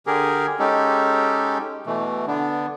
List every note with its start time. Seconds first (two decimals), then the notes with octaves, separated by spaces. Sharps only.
0.07 D3 G4 G#4 A#4
0.59 G#3 C#4 D#4 G4 A4
1.86 B2 E3 A3
2.27 D3 B3 D4